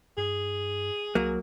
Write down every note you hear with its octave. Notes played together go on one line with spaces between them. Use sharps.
G2 G#4
C2 F#3 A#3